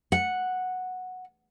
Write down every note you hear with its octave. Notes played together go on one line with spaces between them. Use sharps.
F#5